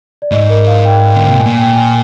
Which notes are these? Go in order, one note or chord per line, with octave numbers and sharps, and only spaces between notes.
D5
G#2 D#5
A#4
F5
G5
D3 G5
C3 G5
A#2 G#5
G5
G#5